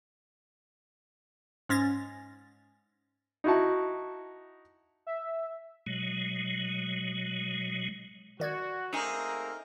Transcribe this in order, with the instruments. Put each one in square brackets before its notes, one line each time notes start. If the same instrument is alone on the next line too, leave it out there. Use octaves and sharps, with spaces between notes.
[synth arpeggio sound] G#2 C#4 A6 A#6
[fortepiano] D#4 E4 F#4 A5
[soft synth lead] E5
[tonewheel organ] B2 F#3 G#3
[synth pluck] D#3 D5 G#6 [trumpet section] F#4
[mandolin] A3 G#4 [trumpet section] A#3 C4 A#4 [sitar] D#4